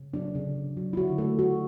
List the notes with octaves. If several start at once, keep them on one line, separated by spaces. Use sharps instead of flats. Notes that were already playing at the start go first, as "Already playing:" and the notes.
Already playing: C#3
F#3 D4
C#3
C#3
F#3
E4
D3 F#4
A3 A4
A3 F#4